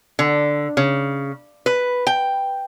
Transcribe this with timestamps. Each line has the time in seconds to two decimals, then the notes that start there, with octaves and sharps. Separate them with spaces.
0.19 D3
0.77 C#3
1.66 B4
2.07 G5